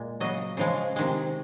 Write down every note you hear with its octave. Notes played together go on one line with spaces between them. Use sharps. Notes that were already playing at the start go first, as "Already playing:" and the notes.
Already playing: A#2 G#3
C#3 F#3 D#5
C#3 F3 G#3
C3 D#3 G#3